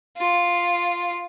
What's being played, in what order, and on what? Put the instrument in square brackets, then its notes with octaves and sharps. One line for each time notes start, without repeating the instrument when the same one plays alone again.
[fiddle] F4